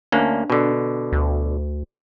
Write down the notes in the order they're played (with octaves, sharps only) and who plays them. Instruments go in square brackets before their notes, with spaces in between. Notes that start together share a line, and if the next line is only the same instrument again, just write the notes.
[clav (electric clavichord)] D2 A#3 C#4 [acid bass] D4
[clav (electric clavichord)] B2 D3
[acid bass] D2